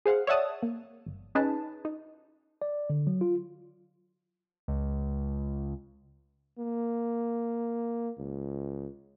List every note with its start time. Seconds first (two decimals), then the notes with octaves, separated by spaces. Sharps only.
0.06 G#4 C5 F5 F#5
0.27 C#5 D5 E5 F#5 A5 D#6
0.62 A#3
1.06 G1
1.35 C#4 D#4 G#4 B4 A5
1.85 D#4
2.62 D5
2.90 D3
3.07 F#3
3.21 F4
4.68 C#2
6.59 A#3
8.18 C#2